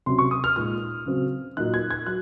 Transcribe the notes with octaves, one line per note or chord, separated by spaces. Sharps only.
C3 F#3 C#4 C6
C#6
D#6
F6
A#2 G#3 D#4 F6
C#3 F#3 C4
A#2 F#3 A#3 D#4 F#6
G#6
G#6
F#3 F#6